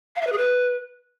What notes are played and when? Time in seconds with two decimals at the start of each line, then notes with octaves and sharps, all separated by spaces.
0.16 F5
0.21 E5
0.27 B4
0.32 G#4
0.38 B4